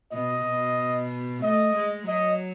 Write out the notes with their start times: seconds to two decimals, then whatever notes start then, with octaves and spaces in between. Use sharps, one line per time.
0.12 B2 D#5
0.44 B2
1.43 A3 D#5
1.75 G#3
2.08 F#3 D#5